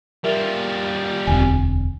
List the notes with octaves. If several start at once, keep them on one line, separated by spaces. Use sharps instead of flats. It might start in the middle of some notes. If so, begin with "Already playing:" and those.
G3 F4 A#4 E5
E1 D2 C4 G#5